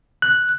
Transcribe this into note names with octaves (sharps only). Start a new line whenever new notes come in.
F#6